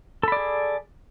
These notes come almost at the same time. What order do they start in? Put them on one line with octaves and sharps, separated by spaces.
A4 B5 D5 G#4